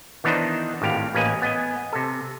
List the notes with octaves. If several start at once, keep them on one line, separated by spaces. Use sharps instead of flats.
D#3 E3 B3 D4 D#4 C5
G#1 A2 G4 F5
A1 A#3 C#4 B4 D#5 G#5
B3 D#5 G#5
C3 A4